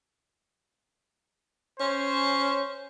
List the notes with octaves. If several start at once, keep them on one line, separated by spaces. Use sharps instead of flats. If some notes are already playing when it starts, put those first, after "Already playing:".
C#4 C5